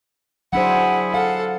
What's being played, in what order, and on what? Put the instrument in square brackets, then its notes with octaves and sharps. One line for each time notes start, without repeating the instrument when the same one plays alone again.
[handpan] F#3 D4 C5 [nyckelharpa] E4 G#4 [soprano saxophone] F#5
[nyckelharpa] A4 [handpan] F5 [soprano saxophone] F#5